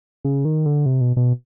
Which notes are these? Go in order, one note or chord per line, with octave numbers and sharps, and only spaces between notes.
C#3
D#3
D3
C3
B2
B2